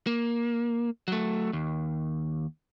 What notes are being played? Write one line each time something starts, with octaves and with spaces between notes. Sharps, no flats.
A#3
F#3 A3
D#2